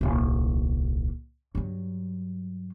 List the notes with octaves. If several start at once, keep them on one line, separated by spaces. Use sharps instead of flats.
D#1 C2
G2 F#3